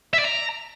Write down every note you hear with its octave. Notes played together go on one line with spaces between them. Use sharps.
E5
D5
A#5